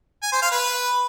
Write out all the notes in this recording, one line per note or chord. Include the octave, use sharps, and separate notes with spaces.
G#5
C5
F5
B4